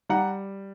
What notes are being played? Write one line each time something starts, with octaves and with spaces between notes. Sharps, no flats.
G3 F#5 A#5